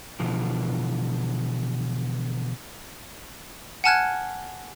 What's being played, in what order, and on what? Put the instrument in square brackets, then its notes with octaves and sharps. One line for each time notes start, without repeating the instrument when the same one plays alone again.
[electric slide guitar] B2 D3 E3 F3
[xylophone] F#5 G#5 A5 F6 F#6 G#6